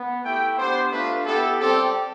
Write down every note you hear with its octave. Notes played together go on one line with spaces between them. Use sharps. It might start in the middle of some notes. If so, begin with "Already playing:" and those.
Already playing: B3
A3 E4 G4 G5
B3 D4 G4 C5
A3 D4 F4 B4
B3 E4 G4 A4
G3 C4 G4 A4